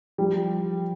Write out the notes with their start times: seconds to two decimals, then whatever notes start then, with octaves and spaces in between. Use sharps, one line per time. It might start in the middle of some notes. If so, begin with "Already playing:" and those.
0.18 F3 G3